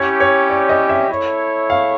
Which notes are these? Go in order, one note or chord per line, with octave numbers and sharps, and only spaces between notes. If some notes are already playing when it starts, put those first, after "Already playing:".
Already playing: C#4 E4 G4 C#5
C#5
D5
D#5
E5
E4 A4 C#5
F5